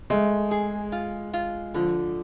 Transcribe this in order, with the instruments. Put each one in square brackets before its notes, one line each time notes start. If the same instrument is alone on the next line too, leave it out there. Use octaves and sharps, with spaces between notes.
[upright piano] G#3 [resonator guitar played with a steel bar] A3
[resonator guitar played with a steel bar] G#4
F4
F4
[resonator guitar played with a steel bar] D3 [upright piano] F3